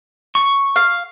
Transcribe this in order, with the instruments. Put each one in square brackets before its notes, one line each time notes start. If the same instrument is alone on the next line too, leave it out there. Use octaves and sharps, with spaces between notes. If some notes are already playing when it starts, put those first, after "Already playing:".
[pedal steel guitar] C#6
[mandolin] F5